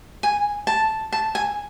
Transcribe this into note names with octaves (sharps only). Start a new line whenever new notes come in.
G#5
A5
A5
G#5